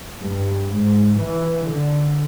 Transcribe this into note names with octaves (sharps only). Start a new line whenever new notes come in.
G2
G#2
E3
D3